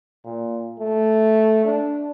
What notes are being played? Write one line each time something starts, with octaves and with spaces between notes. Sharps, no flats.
A#2
A3
D4